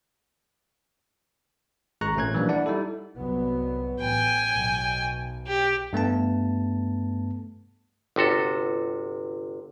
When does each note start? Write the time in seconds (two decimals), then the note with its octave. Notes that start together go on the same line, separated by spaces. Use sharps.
2.01 G#1 G#3 A#5 C#6 F#6 A#6
2.15 A1 A#2 A3 C#4 F#6 G#6
2.34 E3 F3 G3 A#3 D4
2.49 D4 E4 D5 F#5
2.66 G3 D#4 E4 A4
3.16 C2 F#3 B3
4.00 A1 G5 G#5
4.54 B1
5.47 G4
5.93 G2 A3 B3 A5
8.16 G1 C3 F#4 A4